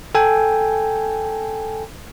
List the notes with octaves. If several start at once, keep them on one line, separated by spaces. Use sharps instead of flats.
A4 G5 G#5